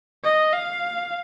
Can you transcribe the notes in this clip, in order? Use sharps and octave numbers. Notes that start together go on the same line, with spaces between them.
D#5
F5